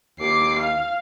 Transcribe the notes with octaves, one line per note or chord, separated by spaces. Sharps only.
D#2 D6 C7
F5